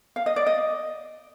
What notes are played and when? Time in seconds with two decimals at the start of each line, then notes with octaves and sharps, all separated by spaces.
0.16 F5
0.26 D#5
0.36 D5
0.46 D#5